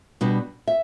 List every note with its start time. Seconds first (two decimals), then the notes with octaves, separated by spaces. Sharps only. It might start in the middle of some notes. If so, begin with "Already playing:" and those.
0.21 B2 G3 B3 D4
0.67 E5